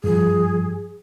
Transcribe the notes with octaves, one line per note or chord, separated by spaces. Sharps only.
G2 F3 G#4